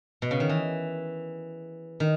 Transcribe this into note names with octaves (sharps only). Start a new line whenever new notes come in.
B2
C#3
D#3
E3
D#3